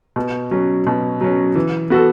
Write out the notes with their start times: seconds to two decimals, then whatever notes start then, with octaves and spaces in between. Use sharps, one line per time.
0.16 B2
0.51 F#3 C#4
0.87 B2
1.21 F#3 C#4
1.55 E3
1.90 B3 F#4 A4